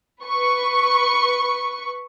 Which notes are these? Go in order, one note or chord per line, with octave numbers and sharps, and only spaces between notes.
B4 C#6